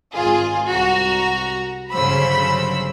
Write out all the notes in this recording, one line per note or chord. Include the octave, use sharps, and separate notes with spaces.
G#1 F4 G#4
C2 F#4 A#5
G1 C#3 F#3 C5 B5 E6